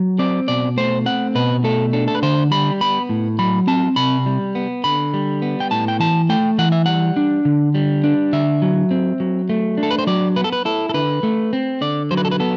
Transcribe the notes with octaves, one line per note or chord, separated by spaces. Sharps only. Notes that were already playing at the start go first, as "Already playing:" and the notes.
Already playing: F#3
C4 D5
B2 D5
A3 C5
C4 F#5
B2 B4
A3 A4
D4 A4
A4
B4
D3 C5
G3 B5
B3 B5
A2
F#3 B5
C4 A5
C3 B5
G3
B3
D3 B5
G3
B3
G5
A2 A5
G5
E3 A5
A3 G5
E3 F#5
E5
G3 F#5
D4
D3
G3
D4
D3 E5
F#3
C4
F#3
A3
D4
A4
B4
C5
F#3 D5
B3 B4
A4
B4
E4 A4
A4
D3 B4
A3
C4
D3 D5
F#3 C5
B4
A4
B4
B3 A4